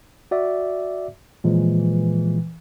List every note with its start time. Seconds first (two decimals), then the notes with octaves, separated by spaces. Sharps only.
0.31 F#4 D5 E5
1.44 A#2 E3 F3 G#3